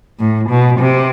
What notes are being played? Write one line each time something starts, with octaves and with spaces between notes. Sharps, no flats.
A2
B2
C3